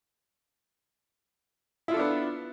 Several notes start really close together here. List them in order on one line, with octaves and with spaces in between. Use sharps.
E4 F4 A4 D4 B3